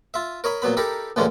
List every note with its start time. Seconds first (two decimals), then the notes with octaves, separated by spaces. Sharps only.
0.14 F4 E5
0.44 A#4 C#5 D#5 B5
0.62 A#2 F#3 B3 B5
0.77 D#4 G4 A4 A#4 B5
1.16 D2 A#2 D3 E3 G#3 C#4